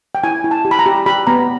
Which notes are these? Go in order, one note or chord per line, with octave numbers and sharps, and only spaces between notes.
G5
E4 G#5
E4
A5
G4
B5
A#5
G4
G4 B5
B3 A#5